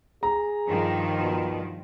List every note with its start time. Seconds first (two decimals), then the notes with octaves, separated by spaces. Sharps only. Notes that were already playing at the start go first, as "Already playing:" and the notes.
0.23 G#4 A#5
0.66 G2 D#3 F3
1.20 B2